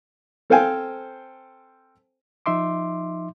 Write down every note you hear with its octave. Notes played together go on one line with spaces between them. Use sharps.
C4 A4 C5 F5 G5 G#5
F3 D#4 E5 C6 D6